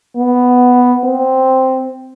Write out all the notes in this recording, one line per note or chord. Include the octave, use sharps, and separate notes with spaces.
B3
C4